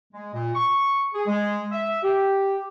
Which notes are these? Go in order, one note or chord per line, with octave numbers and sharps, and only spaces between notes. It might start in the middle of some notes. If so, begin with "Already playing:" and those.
G#3
A#2
C#6
G#4
G#3
E5
G4